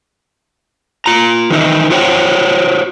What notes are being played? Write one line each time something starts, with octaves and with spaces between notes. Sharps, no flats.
F4 A#5
D#3 E3 D#4 D#5 E5
F4 F#4 C5 C#5 F#5 G5